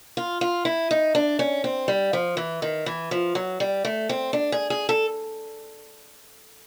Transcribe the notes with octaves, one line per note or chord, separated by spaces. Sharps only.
F4
F4
E4
D#4
D4
C#4
C4
G3
F3
E3
D#3
E3
F3
F#3
G3
A3
C4
D4
G#4
G#4
A4